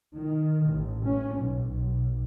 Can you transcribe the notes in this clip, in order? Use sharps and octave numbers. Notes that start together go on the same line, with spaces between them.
D#3
A1
C#4
B1
B1